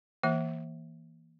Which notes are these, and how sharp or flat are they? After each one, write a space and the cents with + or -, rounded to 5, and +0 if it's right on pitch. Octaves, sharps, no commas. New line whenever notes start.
E3 -15 A#3 +0 E5 +0